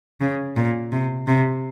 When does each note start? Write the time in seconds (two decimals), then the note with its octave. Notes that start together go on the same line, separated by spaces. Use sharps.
0.21 C#3
0.57 A#2
0.92 C3
1.28 C3